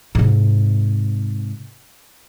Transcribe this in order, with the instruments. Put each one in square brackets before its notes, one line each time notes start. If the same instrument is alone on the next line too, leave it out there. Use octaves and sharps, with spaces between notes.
[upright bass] G#2 C3